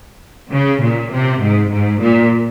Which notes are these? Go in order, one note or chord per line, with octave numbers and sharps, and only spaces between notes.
C#3
A#2
C3
G#2
G#2
A#2